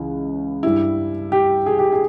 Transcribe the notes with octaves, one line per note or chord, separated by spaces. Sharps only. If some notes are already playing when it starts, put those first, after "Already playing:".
Already playing: C#2 C#3 E3
G2 G3 E4
G4
G#4
G4
G#4